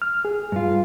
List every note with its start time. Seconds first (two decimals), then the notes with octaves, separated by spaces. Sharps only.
0.02 F6
0.25 G#4
0.52 G2 F4